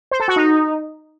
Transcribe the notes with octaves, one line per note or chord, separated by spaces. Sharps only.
C5
A4
F#4
D#4